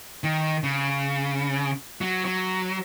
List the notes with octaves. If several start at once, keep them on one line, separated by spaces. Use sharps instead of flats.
D#3
C#3
F#3
F#3